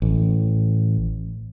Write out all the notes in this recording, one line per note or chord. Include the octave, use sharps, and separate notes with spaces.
A1